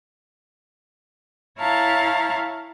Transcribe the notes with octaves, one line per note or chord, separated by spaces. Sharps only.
E4 C#5 F5 A5 A#5